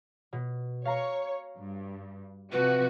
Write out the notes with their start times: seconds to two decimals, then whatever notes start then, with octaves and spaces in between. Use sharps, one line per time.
0.33 B2
0.85 C#5 F5 A#5
1.58 G2
2.52 C3 F3 F#4 B4